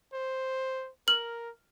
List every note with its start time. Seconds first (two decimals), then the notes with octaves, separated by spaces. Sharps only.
0.14 C5
1.08 A#4 F6 F#7